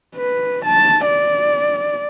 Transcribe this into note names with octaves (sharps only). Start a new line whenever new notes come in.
B4
A5
D5